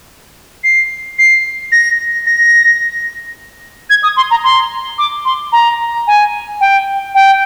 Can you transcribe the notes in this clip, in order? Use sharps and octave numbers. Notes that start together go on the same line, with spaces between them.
C7
C7
A#6
A#6
G#6
D#6
C6
A#5
C6
D6
C6
A#5
G#5
G5
G5